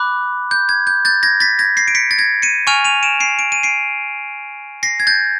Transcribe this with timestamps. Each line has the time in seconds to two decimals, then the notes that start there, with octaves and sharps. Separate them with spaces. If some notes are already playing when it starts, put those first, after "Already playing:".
Already playing: B5 D6 F#6
0.51 G6
0.69 G#6
0.87 G6
1.05 G6 A6
1.23 G#6 A#6
1.40 A6 B6
1.59 G#6 A#6
1.77 A#6 C7
1.88 D7
1.95 B6 C#7
2.11 A6
2.18 G#6 A#6
2.42 C#7 D#7
2.67 G#5 C#6 F6 D#7 F7
2.84 D#7 F7
3.03 D7 E7
3.20 C7 D7
3.39 D7
3.52 D#7
3.63 C7 D7
4.83 A#6 C7
5.00 G#6
5.07 G6 A6